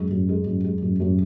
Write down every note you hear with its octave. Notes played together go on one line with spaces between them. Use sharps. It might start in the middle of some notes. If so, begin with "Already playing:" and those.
Already playing: F#2 G#3
F#2
G#3
F#2
G#3
F#2
F#2